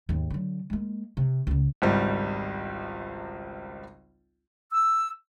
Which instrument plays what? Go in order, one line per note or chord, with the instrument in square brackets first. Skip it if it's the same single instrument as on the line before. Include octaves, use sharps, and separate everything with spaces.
[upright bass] D#2 G#2
D3 F#3
G#3 A#3
C3
C#2 C#3
[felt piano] G#1 C#2 G3
[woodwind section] E6